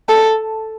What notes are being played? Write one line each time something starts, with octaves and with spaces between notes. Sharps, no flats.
A4